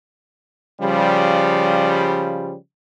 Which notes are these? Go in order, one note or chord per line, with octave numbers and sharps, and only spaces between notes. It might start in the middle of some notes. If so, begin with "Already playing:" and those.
C#3 F3 G3